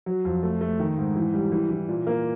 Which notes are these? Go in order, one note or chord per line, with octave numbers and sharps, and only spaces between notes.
F#3
F2
A3
A3
D#3
G#2
E3
G3
E3
E3
A#2
A#3